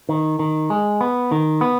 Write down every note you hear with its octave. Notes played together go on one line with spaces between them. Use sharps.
D#3
D#3
G#3
B3
D#3
B3